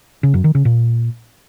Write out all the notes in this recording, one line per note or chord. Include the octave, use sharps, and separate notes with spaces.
C#3
F#2
D#3
C#3
A#2